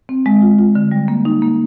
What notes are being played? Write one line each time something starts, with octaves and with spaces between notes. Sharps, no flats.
C4
G#3
F4
F4
D3
G3
A#3
D#4
A#3